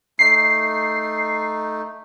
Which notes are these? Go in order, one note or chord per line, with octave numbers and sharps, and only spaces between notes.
A3 D#4 C7